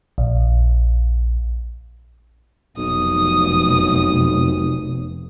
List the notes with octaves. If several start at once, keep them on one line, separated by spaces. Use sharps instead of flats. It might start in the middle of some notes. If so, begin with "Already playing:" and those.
A#1
F1 B1 D#6